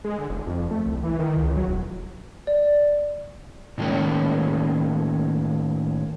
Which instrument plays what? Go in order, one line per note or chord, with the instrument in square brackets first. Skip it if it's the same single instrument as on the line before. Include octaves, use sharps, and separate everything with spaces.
[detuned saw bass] G#3
D3
F1
F2
A3
C2
E3
D#3
C#2
F#3
E1
[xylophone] D5
[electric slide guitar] A2 D#3 G#3 A#3 C#4